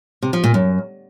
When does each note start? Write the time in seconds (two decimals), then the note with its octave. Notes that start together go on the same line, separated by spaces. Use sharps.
0.23 C3
0.33 F3
0.44 A#2
0.54 F#2